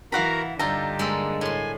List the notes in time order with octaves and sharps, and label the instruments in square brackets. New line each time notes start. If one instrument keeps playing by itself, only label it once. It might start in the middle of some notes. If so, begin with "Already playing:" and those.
[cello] E3 [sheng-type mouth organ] F#4 A#4 A#5 [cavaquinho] F5 F#5 B5
[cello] G2 D3 [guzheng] D#4 F4 A4 [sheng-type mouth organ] G4 [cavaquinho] A#5
[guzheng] G#3 A#3 A4
[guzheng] A2 C6 [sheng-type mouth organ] G#5